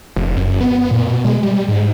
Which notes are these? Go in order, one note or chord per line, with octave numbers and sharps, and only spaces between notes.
F1
F#2
B3
B3
A#2
B2
G#3
G3
G#2